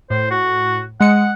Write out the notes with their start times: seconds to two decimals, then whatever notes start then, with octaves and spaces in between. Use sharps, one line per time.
0.10 A2 C5
0.31 F#4
1.00 G#3 F#5 D#6 C#7